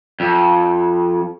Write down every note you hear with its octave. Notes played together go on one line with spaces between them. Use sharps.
F2